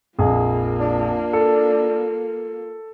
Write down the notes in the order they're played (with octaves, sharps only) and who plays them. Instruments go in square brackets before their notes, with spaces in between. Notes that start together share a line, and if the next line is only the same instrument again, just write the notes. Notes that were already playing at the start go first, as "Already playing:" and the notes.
[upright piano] A#1 F2 G#4 [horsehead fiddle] A#3 F4
[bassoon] D4
[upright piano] A4